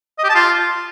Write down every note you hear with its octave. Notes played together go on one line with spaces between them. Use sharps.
D#5
G4
A5
F4